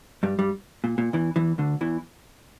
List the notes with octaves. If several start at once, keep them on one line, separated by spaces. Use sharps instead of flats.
G2 G3
G2 G3
A#2
A#2
E2 E3
E2 E3
D2 D3
E2 E3